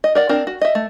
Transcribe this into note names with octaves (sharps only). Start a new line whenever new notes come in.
D#5
A#4 D5 F#5
C4 D4 A#4
F#4
D#5 E5
A3